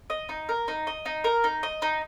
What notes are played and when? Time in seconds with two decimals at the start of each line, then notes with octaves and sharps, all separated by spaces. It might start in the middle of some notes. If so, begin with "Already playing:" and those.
0.10 D#5
0.29 D#4
0.49 A#4
0.68 D#4
0.87 D#5
1.05 D#4
1.24 A#4
1.44 D#4
1.63 D#5
1.82 D#4